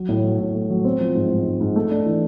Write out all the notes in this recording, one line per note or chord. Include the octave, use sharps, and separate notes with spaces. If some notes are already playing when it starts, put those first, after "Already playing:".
Already playing: F#3
A2
F#3
A2
A3
F#3
C4
F3
G#2
G#2
G#2
G#2
A3
D4
E3